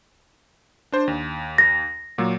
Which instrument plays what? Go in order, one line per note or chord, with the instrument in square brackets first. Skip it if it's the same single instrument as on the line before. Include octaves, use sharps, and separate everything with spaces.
[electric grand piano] D4 C5
D#2
[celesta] A#6
[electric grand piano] A#2 F#3 A#3